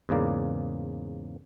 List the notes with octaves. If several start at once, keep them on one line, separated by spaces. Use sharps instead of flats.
E2 G#2 C#3 A#3 D5